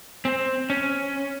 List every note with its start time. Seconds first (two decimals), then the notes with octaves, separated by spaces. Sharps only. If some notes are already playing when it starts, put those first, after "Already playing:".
0.25 C4
0.70 C#4